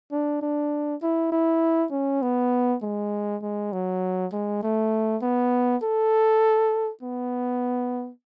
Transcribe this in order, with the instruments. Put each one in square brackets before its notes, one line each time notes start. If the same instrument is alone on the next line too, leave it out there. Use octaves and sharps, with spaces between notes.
[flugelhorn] D4
D4
E4
E4
C#4
B3
G#3
G#3
F#3
G#3
A3
B3
A4
B3